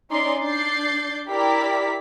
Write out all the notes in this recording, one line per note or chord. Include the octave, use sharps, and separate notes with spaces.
C#4 D#4 D5 C6 C7
D4 D5 G6 A6 C7
E4 G4 A#4 D5 B6